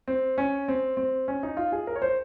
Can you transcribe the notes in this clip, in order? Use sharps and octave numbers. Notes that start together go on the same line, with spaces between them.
C4
C#4
C4
C4
C#4
D#4
F4
G#4
A#4
C#5
C5